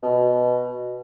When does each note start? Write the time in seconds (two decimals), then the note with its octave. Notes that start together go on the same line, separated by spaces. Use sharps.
0.03 B2